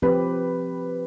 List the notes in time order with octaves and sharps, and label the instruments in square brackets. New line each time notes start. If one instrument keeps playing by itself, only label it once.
[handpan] F3 C4 G4 [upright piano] B4